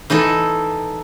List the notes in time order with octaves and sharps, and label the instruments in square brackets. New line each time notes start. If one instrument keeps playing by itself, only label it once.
[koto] E3 D#4 E4 A4